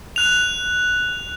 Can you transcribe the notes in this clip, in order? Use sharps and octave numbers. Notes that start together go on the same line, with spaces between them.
F#6 F7